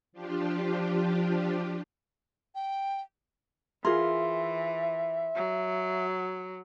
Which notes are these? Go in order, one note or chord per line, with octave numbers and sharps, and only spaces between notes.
F3 D4 F4 G4
G5
E3 F4 G#4 A#4 E5 C6
F#3